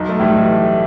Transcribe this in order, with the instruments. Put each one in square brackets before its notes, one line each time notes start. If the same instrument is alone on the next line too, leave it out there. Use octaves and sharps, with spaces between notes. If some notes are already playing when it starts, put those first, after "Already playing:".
Already playing: [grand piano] B1 [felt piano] D#4
[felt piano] A3
[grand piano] A2 E3 [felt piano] G3